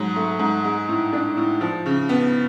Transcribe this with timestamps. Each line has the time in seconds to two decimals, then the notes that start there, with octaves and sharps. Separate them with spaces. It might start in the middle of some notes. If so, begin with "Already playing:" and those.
Already playing: G#2 F#3
0.16 A3
0.39 G#2
0.64 G#3
0.89 A2
1.13 D4
1.37 A2
1.61 F3
1.86 C#3
2.09 B3